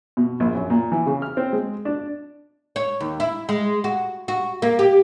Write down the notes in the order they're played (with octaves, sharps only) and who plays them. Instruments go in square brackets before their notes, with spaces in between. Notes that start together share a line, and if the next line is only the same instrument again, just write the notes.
[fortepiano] B2
A#1
F#2
A#2
E3
C#3
F6
C4
G#3
D4
[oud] C#5
D#2
E4
G#3
F#4
F#4
A#3
G4